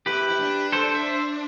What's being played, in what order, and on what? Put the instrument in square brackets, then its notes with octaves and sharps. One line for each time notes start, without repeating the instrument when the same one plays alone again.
[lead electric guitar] E4 [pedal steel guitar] G4 B4
[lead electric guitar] E4
D4
[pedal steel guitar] A4 C5
C5 E5